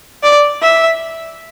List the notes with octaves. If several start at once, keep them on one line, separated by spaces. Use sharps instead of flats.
D5
E5